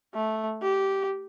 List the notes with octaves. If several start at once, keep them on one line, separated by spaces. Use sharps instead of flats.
A3
G4